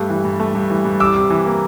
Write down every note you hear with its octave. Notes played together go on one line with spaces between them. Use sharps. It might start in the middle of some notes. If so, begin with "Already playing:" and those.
Already playing: G2 A3
E3
G2
A3
G2
E3
G2
G3 D6 E6
C3
E3
A#3